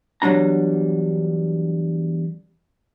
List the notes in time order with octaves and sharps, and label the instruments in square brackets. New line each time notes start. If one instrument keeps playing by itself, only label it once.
[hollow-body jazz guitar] E2 F#3 G3 D4 A#5